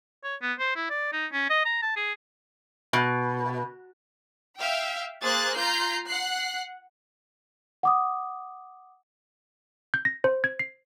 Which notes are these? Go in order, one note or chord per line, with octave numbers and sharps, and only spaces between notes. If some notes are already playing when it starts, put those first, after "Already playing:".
C#5
B3
C5
E4
D5
D#4
C#4
D#5
A#5
A5
G#4
B2
E5 F5 G5
A#3 G#4 C5 F#6 A6
F4 A#5 G6 C7
F#5 F#6 C7
F#5 D6 D#6
G6
A#6
C5
G#6
C7